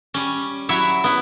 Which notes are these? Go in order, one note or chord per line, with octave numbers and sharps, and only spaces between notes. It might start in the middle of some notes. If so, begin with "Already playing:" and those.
G3 C#4
F#3 E4 C#5 E5
B3 E4